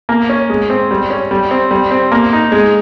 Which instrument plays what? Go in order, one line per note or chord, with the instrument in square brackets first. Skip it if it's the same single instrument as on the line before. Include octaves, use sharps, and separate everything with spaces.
[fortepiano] A#3
C#4
G#3
C4
G3
C#4
G3
C4
G3
C4
A#3
D#4
G#3